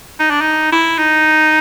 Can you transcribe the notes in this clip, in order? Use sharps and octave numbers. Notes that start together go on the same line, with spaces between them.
D#4
D4
D#4
E4
D#4